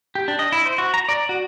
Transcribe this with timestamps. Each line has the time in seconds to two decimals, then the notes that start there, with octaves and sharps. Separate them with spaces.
0.15 G4
0.28 D4
0.39 D#5
0.52 E4
0.66 C5
0.78 F#4
0.94 A#5
1.09 D5
1.29 F#4